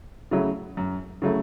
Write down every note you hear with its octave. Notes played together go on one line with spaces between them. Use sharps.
C#3 F#3 A3 E4
F#2
C#3 F#3 A3 E4